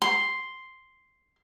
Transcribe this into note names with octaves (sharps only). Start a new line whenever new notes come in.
C6